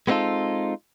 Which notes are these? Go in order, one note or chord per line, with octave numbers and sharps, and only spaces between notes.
G#3 B3 C4 D#4 F4 A4